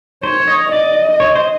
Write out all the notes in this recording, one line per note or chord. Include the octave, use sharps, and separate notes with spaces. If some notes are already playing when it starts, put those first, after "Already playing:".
C5 C#5
D#5
D5 D#5
C#5
C5